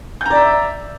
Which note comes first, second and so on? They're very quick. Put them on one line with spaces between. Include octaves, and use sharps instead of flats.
G6 A#5 D5 E5